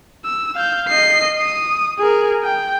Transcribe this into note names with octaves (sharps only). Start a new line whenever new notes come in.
E6
F5 G6
D#5 C7
D#6
G#4 A#4
G5